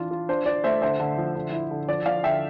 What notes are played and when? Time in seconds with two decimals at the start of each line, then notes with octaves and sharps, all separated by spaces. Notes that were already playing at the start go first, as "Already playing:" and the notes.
Already playing: E3 D4 F4
0.11 F4
0.29 D4 C5
0.46 F4 D5
0.64 A3 C5 E5
0.82 D3 C5 E5
1.00 D3
1.18 F3
1.35 D3
1.52 E4
1.71 D3
1.89 F3 D5
2.06 F3 D5 F5
2.24 D3 E5 G5